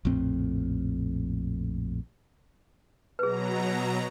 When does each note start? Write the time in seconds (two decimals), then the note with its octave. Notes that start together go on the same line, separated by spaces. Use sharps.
0.05 A#1 F2 A2 C4
3.19 B2 F#3 G#4 B4 A#5